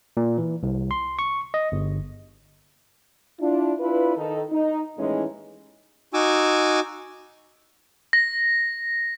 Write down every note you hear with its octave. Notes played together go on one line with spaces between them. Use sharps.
A#2
E3
C2
C6
C#6
D#5
G1
D4 E4 F4
D4 E4 F4 B4
D#3 D#4 A4
D#4
D#2 A2 E3 G#3 C#4 D#4
D#4 F#4 G#5 D6 E6
A#6